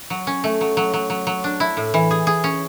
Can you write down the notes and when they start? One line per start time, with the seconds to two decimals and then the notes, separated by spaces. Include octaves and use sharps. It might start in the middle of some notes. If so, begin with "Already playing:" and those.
0.10 F#3
0.27 C#4
0.44 A3
0.61 F#3
0.77 F#3
0.94 F#3
1.10 F#3
1.27 F#3
1.44 D4
1.60 E4
1.77 A2
1.94 E3
2.11 G#4
2.27 G#4
2.44 C#4